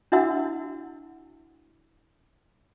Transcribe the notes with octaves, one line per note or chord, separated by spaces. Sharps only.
D4 E4 F#4 E5 F#5 E6